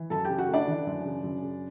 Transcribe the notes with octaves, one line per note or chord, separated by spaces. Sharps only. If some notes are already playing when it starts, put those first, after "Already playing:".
Already playing: E3
F#2 A4 A5
C#3 G4 G5
F#4 F#5
A3 D4 D5
E3
F#2
C#3
F#2
C#3